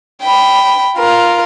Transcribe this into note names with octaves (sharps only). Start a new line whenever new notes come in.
G5 B5
F4 A#4